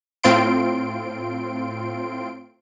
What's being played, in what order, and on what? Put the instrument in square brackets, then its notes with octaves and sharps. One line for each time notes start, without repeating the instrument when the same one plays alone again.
[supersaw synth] A2 C4 F4 C6 D7